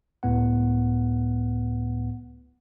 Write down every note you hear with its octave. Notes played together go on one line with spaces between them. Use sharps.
C#2 A2 B3 F#5